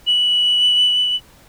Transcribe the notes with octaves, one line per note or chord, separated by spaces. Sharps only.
F#7